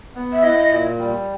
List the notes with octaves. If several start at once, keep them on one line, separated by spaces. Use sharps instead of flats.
B3
E5
E4 D#5
A#2
G3